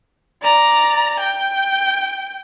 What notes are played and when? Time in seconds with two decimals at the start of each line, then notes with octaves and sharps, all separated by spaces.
0.42 D5 A#5
1.19 G5